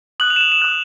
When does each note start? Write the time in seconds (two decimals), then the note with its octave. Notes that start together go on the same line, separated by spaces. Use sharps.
0.20 D#6 F#6 F#7
0.30 F7
0.36 E7
0.41 F7
0.52 E7
0.62 D#6 F#6